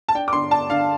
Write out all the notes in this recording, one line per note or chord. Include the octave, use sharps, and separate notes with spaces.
A5
D4 G5
D6
D3 C6
D4 A5
D3 F5